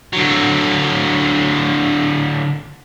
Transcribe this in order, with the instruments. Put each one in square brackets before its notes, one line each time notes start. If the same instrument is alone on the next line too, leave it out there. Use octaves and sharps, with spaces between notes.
[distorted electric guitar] D3 F#3